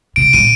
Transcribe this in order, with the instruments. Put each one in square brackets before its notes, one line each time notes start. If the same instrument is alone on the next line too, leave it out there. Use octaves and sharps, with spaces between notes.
[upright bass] C3 [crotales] D7
[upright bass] A#2 [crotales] D#7